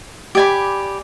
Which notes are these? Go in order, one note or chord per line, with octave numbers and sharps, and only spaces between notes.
G4 D5 G#5 B5